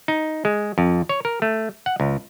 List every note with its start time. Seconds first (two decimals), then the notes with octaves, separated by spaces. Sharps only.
0.08 D#4
0.45 G#3
0.78 F2
1.09 C#5
1.25 A#4
1.42 A3
1.86 F#5
2.00 C#2